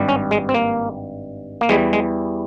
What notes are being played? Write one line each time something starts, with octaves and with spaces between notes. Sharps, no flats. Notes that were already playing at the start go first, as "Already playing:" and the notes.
Already playing: G#1 G2 G3
C#4
G#3
C4
A#3
A#3
E2 E3 G3 G#3
G#3